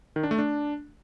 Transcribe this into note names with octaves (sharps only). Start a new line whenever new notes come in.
D#3
D4
A3
D4